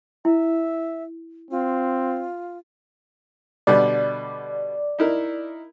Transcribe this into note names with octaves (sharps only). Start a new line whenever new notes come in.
E4 E5
C4 F4
B2 D3 G3 D5
D#4 E4 A#4